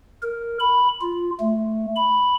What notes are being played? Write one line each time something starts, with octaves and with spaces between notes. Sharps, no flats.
A#4
B5
F4
A3
B5